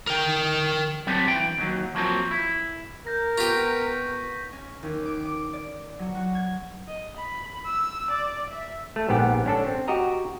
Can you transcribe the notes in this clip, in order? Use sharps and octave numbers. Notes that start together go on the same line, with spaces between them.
A#4 G5
F#3 G3 B3 C4 D4
E3 G5
D#2 F#3
F3 F#3 A#3 C4
E4
A#4 G6 A#6
B3 F4 G4 C#6 A#6 B6
C#4
D#2
D6
D6
D5
F#3
F#4
G#6
D#5
B5
E6
D5
E5
A3
A#1 G#2 B3 G4 F#5
C#4 D4 A4
C4
F#4 G4 D#5 A#5